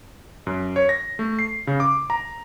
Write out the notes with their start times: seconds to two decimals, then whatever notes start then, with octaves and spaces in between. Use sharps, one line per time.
0.47 F#2
0.76 C#5
0.89 A#6
1.19 A3
1.39 C7
1.67 C#3
1.80 D6
2.10 A#5